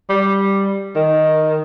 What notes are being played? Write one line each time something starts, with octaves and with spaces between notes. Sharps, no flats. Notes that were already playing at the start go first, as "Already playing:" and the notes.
G3
D#3